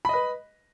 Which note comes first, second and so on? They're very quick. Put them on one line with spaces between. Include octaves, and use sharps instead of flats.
B5 D#5 B4